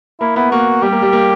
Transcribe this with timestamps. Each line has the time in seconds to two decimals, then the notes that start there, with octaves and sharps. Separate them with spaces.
0.21 A#3 E4
0.36 B3 E4
0.52 A#3 F#4
0.82 G3 G4
0.92 A#3
1.02 G3
1.13 A#3